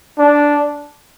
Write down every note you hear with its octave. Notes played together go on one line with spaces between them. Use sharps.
D4